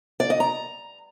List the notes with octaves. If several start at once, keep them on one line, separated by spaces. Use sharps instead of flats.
D5
D#5
A#5